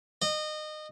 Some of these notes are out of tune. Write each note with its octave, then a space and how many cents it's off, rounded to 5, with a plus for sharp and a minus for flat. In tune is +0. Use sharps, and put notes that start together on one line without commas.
D#5 -25